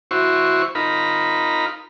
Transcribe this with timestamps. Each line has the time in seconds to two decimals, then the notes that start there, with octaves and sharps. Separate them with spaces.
0.11 E4 F#4 C5 C#6
0.75 D#4 F4 A#4 B5